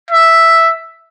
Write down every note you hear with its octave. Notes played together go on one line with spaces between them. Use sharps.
E5